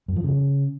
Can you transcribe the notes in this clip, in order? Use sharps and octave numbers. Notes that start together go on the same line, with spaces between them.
F#2
F3
C#3